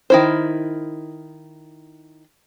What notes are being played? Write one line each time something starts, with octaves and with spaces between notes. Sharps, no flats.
D#3 E4 C5